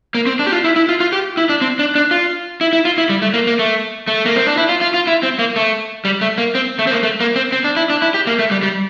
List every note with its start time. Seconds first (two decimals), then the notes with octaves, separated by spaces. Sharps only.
0.15 A#3
0.26 C4
0.39 D4
0.47 G4
0.52 F4
0.64 E4
0.76 E4
0.89 F4
1.00 F4
1.12 G4
1.37 E4
1.49 D4
1.61 C4
1.79 D4
1.95 D4
2.11 F4
2.61 E4
2.73 E4
2.85 F4
2.98 E4
3.09 G3
3.22 A3
3.34 A#3
3.47 A#3
3.59 A3
4.08 A3
4.26 A#3
4.36 C4
4.47 D4
4.58 E4
4.69 F4
4.81 F4
4.94 F4
5.07 E4
5.23 C4
5.39 A#3
5.56 A3
6.05 G3
6.21 A3
6.38 A#3
6.55 C4
6.79 A3
6.87 C4
6.91 A#3
7.03 A3
7.20 A#3
7.36 C4
7.52 C4
7.64 D4
7.77 E4
7.90 D4
8.02 E4
8.14 G4
8.27 A#3
8.39 A3
8.51 G3
8.63 G3